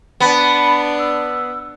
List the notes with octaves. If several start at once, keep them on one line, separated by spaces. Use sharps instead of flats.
B3 D4 B5
E6